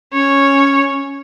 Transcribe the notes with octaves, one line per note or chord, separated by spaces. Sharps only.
C#4 C#5